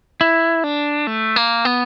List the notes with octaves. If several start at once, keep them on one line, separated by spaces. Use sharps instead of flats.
E4
D4
A3
A#3
B3